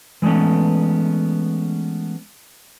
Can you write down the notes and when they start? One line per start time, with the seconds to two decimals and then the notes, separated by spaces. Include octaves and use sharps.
0.22 E3 G#3 A3 B3 C#4